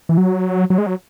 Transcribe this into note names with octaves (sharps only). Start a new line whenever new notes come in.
E3
F#3
F#3
G#3
F#3